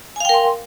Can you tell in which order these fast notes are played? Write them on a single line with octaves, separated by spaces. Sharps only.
G#5 F5 G5 A#4 C6